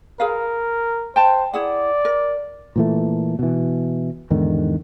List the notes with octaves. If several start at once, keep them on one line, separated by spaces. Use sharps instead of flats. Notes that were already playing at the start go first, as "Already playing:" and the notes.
G#4 A#4 B4 F5
C5 G5 A5
E4 G#4 D5 F#5
A#4
A#2 E3 A3
B2 E3
E2 G#2 D3 D#3